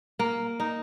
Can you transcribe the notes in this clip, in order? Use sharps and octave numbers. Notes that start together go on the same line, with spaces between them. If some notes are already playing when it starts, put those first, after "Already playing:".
A#3
D#4